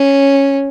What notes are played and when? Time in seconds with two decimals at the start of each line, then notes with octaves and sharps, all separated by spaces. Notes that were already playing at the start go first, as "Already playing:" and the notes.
Already playing: C#4